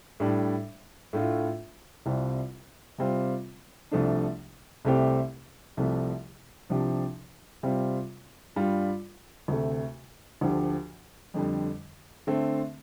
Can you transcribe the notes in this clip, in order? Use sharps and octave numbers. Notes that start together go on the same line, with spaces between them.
A2 G3 D4
A2 A3 D4 F4
C2 C3 G3 C4 F4
C3 G3 C4 F4
C2 C3 F3 A3 D4
C2 C3 A3 C4 G4
C2 C3 F3 A3
C2 C3 F3 D4 G4
C3 G3 C4 F4
G2 G3 F4
D2 C3 A3
D2 D3 F3 D4 G4
F2 D3 G3
D3 A3 C4